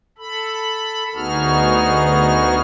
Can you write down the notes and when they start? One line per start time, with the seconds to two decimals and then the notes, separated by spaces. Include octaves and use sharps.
0.18 A4 B5
1.15 D2 B3 D#4 F#4 G#4 F6